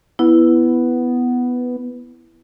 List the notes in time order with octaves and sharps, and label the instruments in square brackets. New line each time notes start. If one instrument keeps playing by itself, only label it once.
[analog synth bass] B3 [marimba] E4